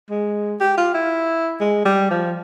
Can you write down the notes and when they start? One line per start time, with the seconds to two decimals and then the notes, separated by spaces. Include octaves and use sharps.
0.11 G#3
0.61 G4
0.78 F4
0.94 E4
1.61 G#3
1.85 G3
2.11 F3